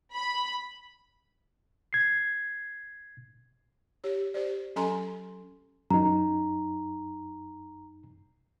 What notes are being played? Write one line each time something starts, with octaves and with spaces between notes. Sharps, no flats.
B5
G#6 C7
G4 C#5
G4 C5 D5
F#3 C#4 A4 G#5 A#5 C6
F#2 D#4 A#5